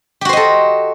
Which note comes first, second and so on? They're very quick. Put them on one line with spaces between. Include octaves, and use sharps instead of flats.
G4 F#4 C5 D#5 A4